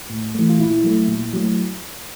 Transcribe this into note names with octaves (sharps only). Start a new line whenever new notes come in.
A2
E3 A3
F4
A#2 E4
F#3 A3
A#2
F#3 A3